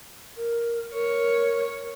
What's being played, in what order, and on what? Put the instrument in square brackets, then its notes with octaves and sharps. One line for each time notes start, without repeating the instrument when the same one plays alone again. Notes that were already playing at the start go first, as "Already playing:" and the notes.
[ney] A#4
[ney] A#4 [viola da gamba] C#5